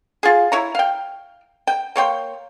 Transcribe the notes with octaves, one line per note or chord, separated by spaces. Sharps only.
F4 G#4
E4 C#5 A#5
F5 G5
G5
A#3 C#5 G5 C6